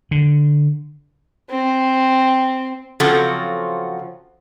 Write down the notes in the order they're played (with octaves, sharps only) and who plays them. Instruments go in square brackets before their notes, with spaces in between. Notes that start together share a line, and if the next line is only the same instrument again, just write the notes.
[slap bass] D3
[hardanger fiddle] C4
[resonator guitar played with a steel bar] C#3 F3 F#3 C4 F#4 A4